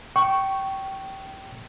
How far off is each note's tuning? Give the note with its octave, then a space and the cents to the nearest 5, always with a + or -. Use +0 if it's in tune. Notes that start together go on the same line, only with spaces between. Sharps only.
G5 -20 C#6 +0